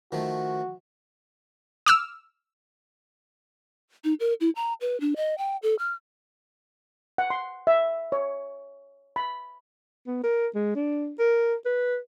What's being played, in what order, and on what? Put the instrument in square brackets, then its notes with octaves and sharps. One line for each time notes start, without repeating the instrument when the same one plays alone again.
[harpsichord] D#3 F3 A3 [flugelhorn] F#4
[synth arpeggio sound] D6 E6 F6
[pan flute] D#4
A#4
E4
A#5
B4
D4
D#5
G5
A4
F6
[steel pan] F#5
C6
E5
C#5
B5
[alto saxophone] B3
A#4
G#3
D4
A#4
B4